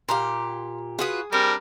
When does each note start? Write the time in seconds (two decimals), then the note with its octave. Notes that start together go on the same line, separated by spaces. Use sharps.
0.09 A#2 G4 F5 A#5 C6
0.99 F4 F#4 G#4 B4 D#6
1.32 G3 C4 D4 A#4